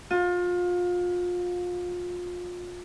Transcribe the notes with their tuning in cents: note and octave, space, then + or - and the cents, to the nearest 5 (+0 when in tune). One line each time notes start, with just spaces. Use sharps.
F4 +30